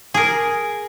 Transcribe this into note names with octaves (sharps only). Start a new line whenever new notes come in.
G#4 A#4